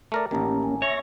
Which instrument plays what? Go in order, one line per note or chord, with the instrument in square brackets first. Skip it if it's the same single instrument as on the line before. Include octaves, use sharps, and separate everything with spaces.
[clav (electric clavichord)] A3 A#4 D5
[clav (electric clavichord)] A1 D#3 [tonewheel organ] A#3 C#4 [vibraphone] G4 A5 A#5
[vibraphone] G#5
[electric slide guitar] C#5 [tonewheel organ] E5 C#6 A#6